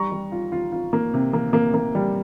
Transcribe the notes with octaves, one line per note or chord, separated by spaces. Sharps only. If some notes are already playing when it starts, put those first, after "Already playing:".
Already playing: G3 A#5 C#6
G3
F4
F4
F4
A#3
C3
A#3
A#3
A#3
G3